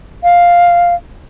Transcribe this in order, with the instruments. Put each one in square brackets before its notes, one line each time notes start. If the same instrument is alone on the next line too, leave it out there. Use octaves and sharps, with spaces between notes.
[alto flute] F5